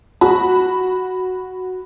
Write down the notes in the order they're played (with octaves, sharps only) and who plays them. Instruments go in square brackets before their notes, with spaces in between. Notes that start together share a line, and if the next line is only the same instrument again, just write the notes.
[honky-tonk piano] F#4 B5